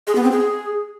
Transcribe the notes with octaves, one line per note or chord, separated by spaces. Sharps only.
G#4
B3
C4
G#4